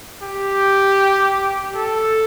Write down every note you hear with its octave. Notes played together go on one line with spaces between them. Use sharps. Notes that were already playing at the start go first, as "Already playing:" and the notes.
G4
A4